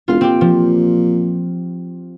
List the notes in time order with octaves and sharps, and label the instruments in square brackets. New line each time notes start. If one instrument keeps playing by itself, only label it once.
[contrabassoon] E1 [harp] F4 F5
[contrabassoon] A#2 [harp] C4 G4
[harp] F3